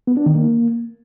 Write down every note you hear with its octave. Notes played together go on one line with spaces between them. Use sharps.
B3
D4
D#3
A#3